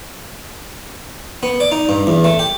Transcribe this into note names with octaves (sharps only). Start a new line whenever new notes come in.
B3
D5
D#4
G2
E2
A3
G4